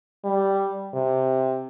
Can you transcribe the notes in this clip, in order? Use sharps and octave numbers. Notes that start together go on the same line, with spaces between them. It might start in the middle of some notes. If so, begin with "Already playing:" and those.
G3
C3